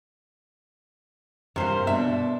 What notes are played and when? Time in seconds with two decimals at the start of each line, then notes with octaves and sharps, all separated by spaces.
1.56 G2 C3 A#3 C5
1.87 B2 D4 E5